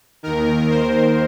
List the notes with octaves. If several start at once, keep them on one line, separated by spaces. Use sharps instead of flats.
D#2 D#3 A#4
C5